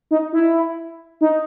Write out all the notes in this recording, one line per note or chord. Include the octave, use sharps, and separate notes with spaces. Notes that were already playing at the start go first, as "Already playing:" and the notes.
D#4
E4
D#4